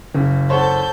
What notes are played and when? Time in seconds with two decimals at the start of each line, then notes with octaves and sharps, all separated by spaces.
0.14 F#1 C#3
0.50 A4 C5 C#5 F#5 G6